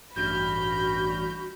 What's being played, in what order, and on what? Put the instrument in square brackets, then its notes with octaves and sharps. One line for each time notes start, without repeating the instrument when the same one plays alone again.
[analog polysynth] A1 G2 F6 [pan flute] F#4 [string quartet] B5 [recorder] G6